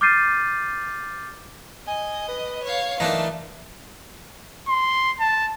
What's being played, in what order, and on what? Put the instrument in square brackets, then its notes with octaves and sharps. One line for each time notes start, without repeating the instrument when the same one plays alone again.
[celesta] D6 F6 G6 A6 C7 D#7
[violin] D#5 [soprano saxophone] G#5
[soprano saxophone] B4
[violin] C#5 F5
[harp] E3 [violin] A3 [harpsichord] A#3 D4 D#4 [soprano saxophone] B4
[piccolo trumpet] C6
A5